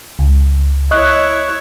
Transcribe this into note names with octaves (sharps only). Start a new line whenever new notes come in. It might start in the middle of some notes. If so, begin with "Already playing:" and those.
C#2
E4 C#5 D#5 C#6 F#6